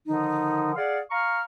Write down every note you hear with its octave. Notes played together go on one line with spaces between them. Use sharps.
D3 D#3 F3 D#4
G#4 D5 F5 F#5
F5 A#5 C#6 F6